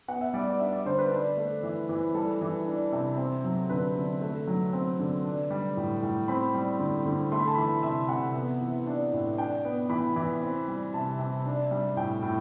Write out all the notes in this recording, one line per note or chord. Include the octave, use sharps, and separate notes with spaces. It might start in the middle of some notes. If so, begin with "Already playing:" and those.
B3 F#5
E5
G3 D5
D5
D4 E5
D5
D3 C5
B4
D4
A3
E3
E3
G3 A4
E3
D4
C3
C4
F#3
D3 B4
D3
A3
F#3
C4
D3
D4
G3
A2
A2
C4 B5
G3
D3
D3
A3 C6
B5
A5
E3 B5
C3 E5
C3 F#5
B3
E3
D4
A2
D4 G5
B3
E3 B5
E3
C4
G3
C3 A5
C3
D4
G3
A2 G5
A2